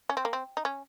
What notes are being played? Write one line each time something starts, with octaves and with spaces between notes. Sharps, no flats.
C#4
C4
A#3
C4
D#4
C#4